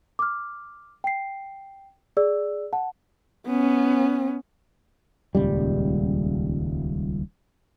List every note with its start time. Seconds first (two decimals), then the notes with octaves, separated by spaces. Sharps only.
0.19 D6 F6
1.04 G5 C7
2.17 G#4 D5 E6
2.73 F#5 A5
3.47 B3 C#4
5.35 D#1 C#2 G3